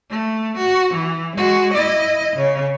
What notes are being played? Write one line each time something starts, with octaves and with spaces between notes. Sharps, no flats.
A3
F#4
E3
G#3 F#4
E4 D#5
C#3 C#5